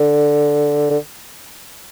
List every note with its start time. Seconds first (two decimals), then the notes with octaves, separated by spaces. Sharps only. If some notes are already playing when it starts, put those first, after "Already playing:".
Already playing: D3
0.90 D3